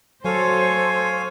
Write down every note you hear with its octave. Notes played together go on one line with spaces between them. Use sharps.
F#3 A4 C5 C#5 F5 G#5